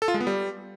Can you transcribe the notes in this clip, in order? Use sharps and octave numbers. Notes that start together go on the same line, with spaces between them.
A4
F4
G#3
B3
G3